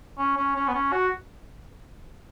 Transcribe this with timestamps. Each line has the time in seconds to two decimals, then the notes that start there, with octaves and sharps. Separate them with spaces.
0.18 C#4
0.37 C#4
0.56 C#4
0.68 B3
0.74 C#4
0.93 F#4